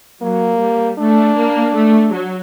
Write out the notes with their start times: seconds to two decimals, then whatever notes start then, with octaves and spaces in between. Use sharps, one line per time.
0.21 F#3 A#3
0.60 G3
0.99 A3 D4
1.37 A#3
1.74 A3
2.12 F#3